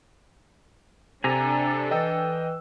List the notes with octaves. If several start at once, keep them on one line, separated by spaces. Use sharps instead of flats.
C3 D4 A4 G#5 A#5
E3 D#5 G5 E6